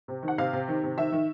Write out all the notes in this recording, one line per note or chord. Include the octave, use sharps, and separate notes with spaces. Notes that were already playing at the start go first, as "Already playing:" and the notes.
C3
D#3
F#5
C3 F5
C3
D#3
C3
D#3 E5
D#3